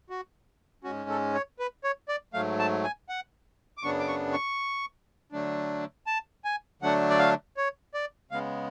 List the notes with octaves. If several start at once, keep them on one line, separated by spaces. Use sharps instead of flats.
F#4
G#2 G#3 C#4 F#4
A4
C#5
B4
C#5
D5
G#2 F#3 A3 F5
A5
G#5
F#5
D6
F#2 C#3 F#3 B3 D4 C#6
D6
C#6
C#6
D3 F#3 A3 D4
A5
G#5
D3 F#3 A3 D4 F#5
D5
F5
C#5
D5
C#3 G#3 B3 F5